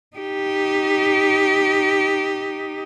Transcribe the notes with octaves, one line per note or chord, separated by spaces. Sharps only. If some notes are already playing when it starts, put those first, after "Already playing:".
D#4 G4